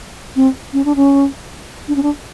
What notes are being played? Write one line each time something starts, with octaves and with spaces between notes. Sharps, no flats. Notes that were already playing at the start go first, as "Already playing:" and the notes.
C4
C#4
D4
C#4
D4
C#4
D4